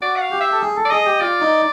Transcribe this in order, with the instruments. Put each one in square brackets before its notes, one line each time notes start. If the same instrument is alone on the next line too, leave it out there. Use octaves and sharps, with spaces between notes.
[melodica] F#4 [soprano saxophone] D5
[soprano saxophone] F#5
F5
[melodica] G4
[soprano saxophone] E5
[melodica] A4
G#4
A4
[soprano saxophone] D5
[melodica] G#4 [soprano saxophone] D#5
[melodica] G4
[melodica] F4 [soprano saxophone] D5
[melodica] D#4